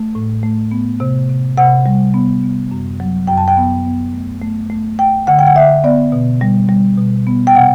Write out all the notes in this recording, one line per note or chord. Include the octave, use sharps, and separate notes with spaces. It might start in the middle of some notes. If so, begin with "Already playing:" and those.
Already playing: A3
A2
A3
B3
C3
C3
C3 F#5
G3
B3
B3
F#2
F#3
F#2 G5
A5
G5
B3
B3
A3
A3
A3
A3 G5
D3 F#5
G5
F#5
D3 E5
B3 D5
B2
G3
G3
B2
B3
G5
C3 F#5